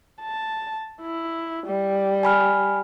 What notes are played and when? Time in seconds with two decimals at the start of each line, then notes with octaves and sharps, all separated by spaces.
0.22 A5
1.02 E4
1.67 G3
2.23 G#5 B5 F6